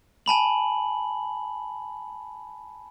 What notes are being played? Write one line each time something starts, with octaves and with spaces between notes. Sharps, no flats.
G#5 A5 B5 F#7